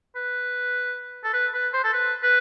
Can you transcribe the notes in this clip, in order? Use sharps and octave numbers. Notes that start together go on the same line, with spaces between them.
B4
A4
B4
B4
C5
A4
B4
B4